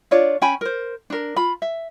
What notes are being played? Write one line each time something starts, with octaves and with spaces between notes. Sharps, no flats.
D4 F4 C#5 D5
C#4 G5 G#5 B5
A#4 C5
D4 A#4
F4 B5
E5